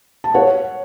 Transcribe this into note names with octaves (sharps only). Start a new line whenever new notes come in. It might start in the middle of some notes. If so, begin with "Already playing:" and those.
A5
C#5 F#5